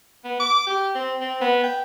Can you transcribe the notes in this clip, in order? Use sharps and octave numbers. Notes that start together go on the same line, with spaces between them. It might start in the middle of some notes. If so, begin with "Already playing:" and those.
B3
D6
G4
C4
C4
B3
G5